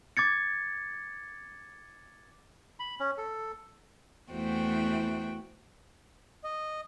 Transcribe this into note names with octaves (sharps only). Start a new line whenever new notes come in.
D6 G#6 A6 C#7
B5
C#4
A4
E2 E3 A3 F#4 C5 G5
D#5